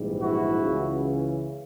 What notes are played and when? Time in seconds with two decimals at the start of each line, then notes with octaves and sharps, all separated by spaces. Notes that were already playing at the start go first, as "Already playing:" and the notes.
Already playing: A#1 G#2 E3 G3
0.21 E4 F#4
0.63 C#2 C#3 E3